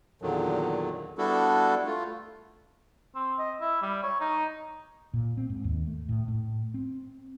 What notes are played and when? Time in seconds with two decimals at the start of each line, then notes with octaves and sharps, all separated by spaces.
0.22 E2 A#2 D3 D#3 F#3
1.18 G3 B3 D4 E4 F#4 A4
1.86 A3 F4
3.15 C4
3.39 D#5
3.61 E4
3.82 G3
4.03 C#5
4.20 D#4
5.14 A#2
5.37 C4
5.50 G#2
5.64 D#2
5.87 A3
6.09 A2
6.28 A2
6.74 C4